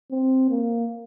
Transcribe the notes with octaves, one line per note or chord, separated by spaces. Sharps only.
C4
A#3